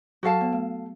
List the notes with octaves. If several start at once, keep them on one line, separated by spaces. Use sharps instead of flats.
F#3 F#4 A4 F5 A5
B3
A3